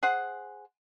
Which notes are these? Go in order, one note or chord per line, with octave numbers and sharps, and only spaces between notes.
G#4 C5 F#5